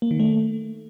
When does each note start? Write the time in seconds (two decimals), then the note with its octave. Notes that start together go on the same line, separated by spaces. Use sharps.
0.02 A#3
0.11 D#3
0.20 A3